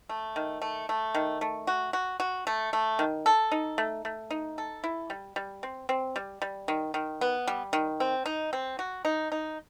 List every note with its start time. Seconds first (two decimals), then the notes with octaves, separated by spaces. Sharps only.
0.09 A3
0.36 D#3
0.62 A3
0.89 A3
1.15 D#3
1.41 A3
1.67 F#4
1.93 F#4
2.20 F#4
2.47 A3
2.73 A3
2.99 D#3
3.26 A4
3.52 D#4
3.78 A3
4.05 A3
4.31 D#4
4.58 A4
4.84 E4
5.10 G3
5.36 G3
5.63 C4
5.89 C4
6.16 G3
6.42 G3
6.68 D#3
6.94 D#3
7.21 B3
7.48 G3
7.73 D#3
8.00 C4
8.26 D#4
8.53 C4
8.79 F#4
9.05 D#4
9.32 D#4